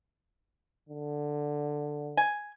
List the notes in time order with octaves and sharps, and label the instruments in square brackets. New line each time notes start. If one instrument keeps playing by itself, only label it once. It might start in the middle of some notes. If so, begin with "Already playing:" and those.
[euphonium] D3
[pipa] G#5